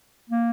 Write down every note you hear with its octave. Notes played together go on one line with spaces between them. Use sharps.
A#3